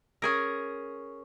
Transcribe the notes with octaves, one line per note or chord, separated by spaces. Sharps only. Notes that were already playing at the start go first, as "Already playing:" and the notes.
C#4 G#4 A#4